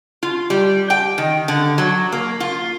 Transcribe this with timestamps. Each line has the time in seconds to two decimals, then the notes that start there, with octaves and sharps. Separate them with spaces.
0.23 F4
0.50 G3
0.90 G5
1.18 D#3
1.48 D3
1.78 F#3
2.12 A#3
2.40 F4